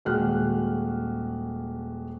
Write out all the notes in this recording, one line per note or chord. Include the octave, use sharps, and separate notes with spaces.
D#1 G#3 F#4 F6 F#6